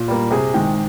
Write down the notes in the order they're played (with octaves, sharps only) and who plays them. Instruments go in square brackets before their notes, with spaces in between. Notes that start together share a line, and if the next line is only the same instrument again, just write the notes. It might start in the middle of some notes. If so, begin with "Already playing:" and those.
Already playing: [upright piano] A#2
G3 A#3
C3 G#4
D#3 G#3 G5